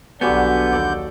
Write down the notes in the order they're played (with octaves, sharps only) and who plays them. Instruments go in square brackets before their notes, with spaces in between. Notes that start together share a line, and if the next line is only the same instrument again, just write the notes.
[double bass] B1 D4 [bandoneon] D3 G6 [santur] G3 F#4 G#5 [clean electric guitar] B3
[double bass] D#2 [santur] A4 D5